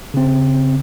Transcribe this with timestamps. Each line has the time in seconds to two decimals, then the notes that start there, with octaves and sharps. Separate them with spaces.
0.14 C#3 C4